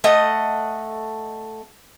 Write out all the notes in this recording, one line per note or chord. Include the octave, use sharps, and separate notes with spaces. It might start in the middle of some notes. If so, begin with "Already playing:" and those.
A3 D#5 F#5